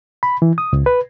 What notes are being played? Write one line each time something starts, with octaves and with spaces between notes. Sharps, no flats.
B5
E3
D#6
C#2
B4